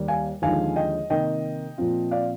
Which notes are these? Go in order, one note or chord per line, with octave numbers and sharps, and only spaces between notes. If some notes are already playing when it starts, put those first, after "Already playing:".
Already playing: D#2 D#3 G3
F5 G#5
D#2 D3 F3 G#3 D#4 F5 G#5
D#5 G5
C3 D#3 A#3 D#5 G5
A#2 F3 C4 F4
D5 F5